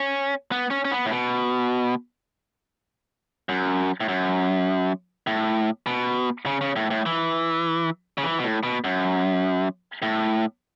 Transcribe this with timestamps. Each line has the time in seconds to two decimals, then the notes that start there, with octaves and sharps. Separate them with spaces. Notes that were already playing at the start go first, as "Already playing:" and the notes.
Already playing: C#4
0.52 B3
0.70 C#4
0.85 C#4
0.91 B3
1.05 A2
1.10 B2
3.49 F#2
4.00 A2
4.08 F#2
5.27 A2
5.87 B2
6.46 C#3
6.61 C#3
6.76 A2
6.91 A2
7.06 E3
8.18 C#3
8.24 E3
8.39 B2
8.44 A2
8.63 B2
8.84 F#2
10.02 A2